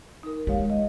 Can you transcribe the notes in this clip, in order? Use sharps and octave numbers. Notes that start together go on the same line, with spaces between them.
D#4 A#4
G#3 G4 C#5 F5
D#5